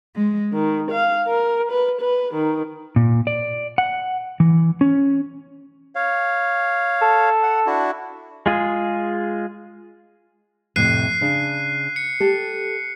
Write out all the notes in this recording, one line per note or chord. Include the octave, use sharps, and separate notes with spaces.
G#3
D#3
F5
A#4
B4
B4
D#3
A#2
D5
F#5
E3
C#4
C#5 F5
A4
F#5
D4 E4 F#4
G#3 F4 G#4
F2 A2 C3 F#6 C7 D#7
C#3 D4
C#7
G4 A4